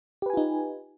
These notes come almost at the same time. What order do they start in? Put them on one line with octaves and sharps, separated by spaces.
G4 B4 G#5 F4 D#4